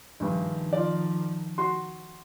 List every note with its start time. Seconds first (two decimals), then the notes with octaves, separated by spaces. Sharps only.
0.20 A#1 G2 D#3 F3
0.73 F4 D5
1.58 F#4 C6